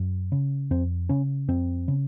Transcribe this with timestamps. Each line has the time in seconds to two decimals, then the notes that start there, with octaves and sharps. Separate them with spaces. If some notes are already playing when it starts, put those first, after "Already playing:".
Already playing: F#2
0.32 C#3
0.71 F2 C4
1.09 C#3 C#4
1.48 F2 C4
1.88 C#3